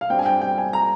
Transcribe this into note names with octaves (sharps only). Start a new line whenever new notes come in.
F5
G2 G3 C4 G5
G#5
G5
G5
G#5
A#5